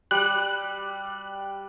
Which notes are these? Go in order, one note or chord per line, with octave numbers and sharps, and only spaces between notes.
G3 F#6